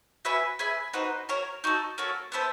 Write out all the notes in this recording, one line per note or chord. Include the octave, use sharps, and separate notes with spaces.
F#4 B4 E5 G#5
G#4 B4 E5 G#5
C4 D#4 F#4 B4
F#4 A#4 C#5
D#4 F#4 A4
A#3 C#4 F#4 A4
B3 E4 A4 C5